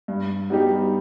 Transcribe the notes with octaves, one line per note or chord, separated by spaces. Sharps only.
G2
G3 B3 D#4 G4